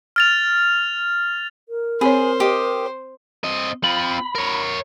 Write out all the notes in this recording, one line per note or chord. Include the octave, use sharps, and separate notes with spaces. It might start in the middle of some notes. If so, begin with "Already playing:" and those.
F6 A6 F7
A#4
C4 G#4 C5 C#5
G4 D#5
C4 D#5
C4 F4 B5
A#4 C#5